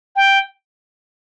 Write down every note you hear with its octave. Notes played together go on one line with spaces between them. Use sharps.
G5